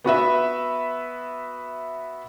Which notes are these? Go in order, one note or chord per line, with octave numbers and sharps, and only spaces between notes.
B3 F#4 B4 E5